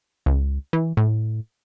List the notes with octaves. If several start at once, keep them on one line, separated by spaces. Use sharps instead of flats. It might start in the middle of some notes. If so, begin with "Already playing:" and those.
C#2
E3
A2